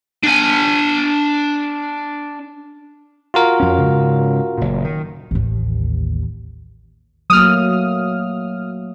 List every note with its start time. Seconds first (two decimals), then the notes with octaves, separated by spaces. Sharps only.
0.23 D4 G#5
3.34 F4 F#4 A#4
3.60 F2 C#4
3.78 G#2 C#3
4.58 F#1 A#2
4.84 D#3
5.31 A1 D#2
7.30 F#3 A3 A#3 D#6 F6